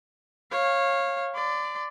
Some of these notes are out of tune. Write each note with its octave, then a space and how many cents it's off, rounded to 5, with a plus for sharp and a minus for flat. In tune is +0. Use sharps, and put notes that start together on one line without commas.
C#5 -20 F5 +0
D5 +5 C6 -45